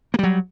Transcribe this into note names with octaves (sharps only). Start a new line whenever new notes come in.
F#3 G3 A#3